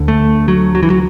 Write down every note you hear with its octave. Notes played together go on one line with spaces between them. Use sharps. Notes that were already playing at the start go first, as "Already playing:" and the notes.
Already playing: D2 D3
A3
F#3
F#3
E3
F#3